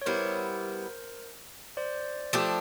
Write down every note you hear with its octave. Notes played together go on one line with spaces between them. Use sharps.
C#5
G3 B3 E4 A#4 C5
C5 D5
F3 A3 D4 G4